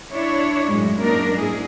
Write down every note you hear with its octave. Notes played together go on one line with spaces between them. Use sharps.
D4 E4 C#5
F#2 A2 G#3
F#2 A#3 D4 D#4 A#4
G#2 E4 G#4